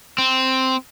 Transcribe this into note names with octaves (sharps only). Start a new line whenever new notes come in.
C4